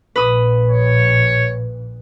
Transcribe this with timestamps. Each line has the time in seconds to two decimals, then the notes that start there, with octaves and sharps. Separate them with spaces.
0.16 A#1 A#2 B4 D#6
0.69 C#5